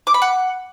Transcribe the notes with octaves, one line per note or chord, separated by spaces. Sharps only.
D6
B5
F#5